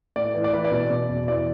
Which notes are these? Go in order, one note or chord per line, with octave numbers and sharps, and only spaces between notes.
A2 D5
E3
D5
E3 B4
D5
B2
B2
E2
E3 D5